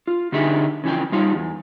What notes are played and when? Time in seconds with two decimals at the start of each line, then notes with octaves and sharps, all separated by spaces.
0.07 F4
0.32 D3 D4 D#4 G4 G#4 E5
0.84 C#3 E3 F3 G5
1.12 G3 D#4 F4 C5 F5
1.35 E2